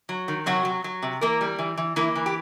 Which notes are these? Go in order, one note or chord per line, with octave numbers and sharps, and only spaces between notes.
F#3
D#3
C3 F#3 F#4
F#3
F#3
C3
E3 A#3 A#4
G3
E3
E3
E3 A#3 E4
E3
G4